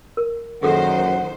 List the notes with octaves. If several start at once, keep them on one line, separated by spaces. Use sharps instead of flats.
A#4
F#2 A#2 D#3 G#4 A4 C5 F#5